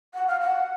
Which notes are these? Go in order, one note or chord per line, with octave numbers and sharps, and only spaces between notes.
F#5
F5
F#5